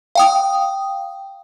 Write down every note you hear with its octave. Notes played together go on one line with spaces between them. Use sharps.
F5 G5 D#6